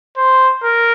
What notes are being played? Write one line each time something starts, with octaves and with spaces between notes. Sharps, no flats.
C5
A#4